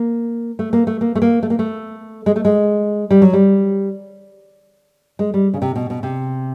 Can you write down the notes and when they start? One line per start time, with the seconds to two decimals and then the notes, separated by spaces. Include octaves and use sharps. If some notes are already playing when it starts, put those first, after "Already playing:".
Already playing: A#3
0.59 A3
0.73 A#3
0.87 A3
1.01 A#3
1.15 A3
1.22 A#3
1.43 A3
1.50 A#3
1.59 A3
2.26 G#3
2.36 A3
2.45 G#3
3.11 G3
3.22 F#3
3.33 G3
5.19 G#3
5.34 G3
5.54 C#3
5.62 C3
5.76 B2
5.90 B2
6.03 C3